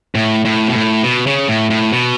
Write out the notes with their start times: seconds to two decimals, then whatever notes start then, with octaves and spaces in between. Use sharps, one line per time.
0.15 A2
0.45 A2
0.68 B2
0.75 A2
1.04 B2
1.27 C#3
1.48 A2
1.70 A2
1.92 B2